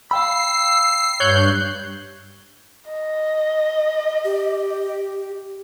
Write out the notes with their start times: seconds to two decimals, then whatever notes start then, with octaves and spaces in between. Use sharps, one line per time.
0.11 F5 G5 B5 E6 C7
1.20 G2 C#5 F#6 G6
2.90 D#5
4.25 G4